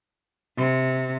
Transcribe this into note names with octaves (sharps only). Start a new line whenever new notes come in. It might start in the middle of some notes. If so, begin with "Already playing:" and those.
C3